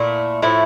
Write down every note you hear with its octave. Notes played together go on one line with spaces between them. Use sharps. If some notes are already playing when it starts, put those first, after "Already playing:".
Already playing: A#2 A3 E4
A2 F3 A3 E4